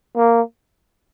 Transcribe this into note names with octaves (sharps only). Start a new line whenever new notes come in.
A#3